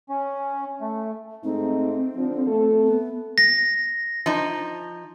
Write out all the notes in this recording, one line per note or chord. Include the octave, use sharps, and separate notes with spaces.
C#4
A3
G#2 A3 C4 D#4
D3 F3
A3 A4
B3
A#6
F3 D#4